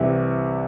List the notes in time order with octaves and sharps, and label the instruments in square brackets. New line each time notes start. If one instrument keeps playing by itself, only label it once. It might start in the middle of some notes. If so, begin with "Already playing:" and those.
Already playing: [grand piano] C2 C3 E3 E5